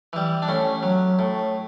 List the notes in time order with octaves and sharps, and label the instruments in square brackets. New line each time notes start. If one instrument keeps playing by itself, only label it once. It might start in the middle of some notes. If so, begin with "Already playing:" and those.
[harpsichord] E3 G3
D4
A2 C#4
F#3
A2